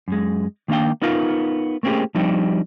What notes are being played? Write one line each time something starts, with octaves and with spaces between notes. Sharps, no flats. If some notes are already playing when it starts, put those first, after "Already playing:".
F#2 G#3
D#3 A#3 D4 F5 G5
B3 D#4 F4 A#4 F5
A3 A#3 C4 C#4 G4 G#4
F3 G3 C4 D4 D#4 G4